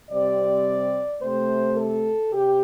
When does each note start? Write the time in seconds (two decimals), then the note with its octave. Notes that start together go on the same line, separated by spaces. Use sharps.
0.10 C3 G3 C4 D5
1.21 C3 A3 C4 C5
1.77 A4
2.33 C3 G4